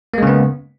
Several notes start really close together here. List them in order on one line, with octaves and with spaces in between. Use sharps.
A#3 G#3 C#3 B3